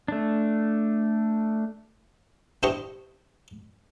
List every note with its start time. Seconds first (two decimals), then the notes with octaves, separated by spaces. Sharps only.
0.08 A3 D4
2.63 D4 E4 G4 C5 D#5 C#6